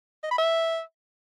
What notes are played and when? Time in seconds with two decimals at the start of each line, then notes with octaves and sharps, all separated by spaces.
0.24 D#5
0.31 B5
0.38 E5